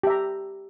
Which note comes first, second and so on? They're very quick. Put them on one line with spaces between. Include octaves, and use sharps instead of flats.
G4 E5 A#5